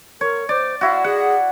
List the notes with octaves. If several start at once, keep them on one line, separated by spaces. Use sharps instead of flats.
A#4 C#5
C5 D5
E4 F#4 F5
G#4 F#5